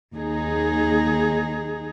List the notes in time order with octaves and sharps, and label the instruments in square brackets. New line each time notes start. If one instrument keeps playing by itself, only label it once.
[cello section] D#2 D#4 G#4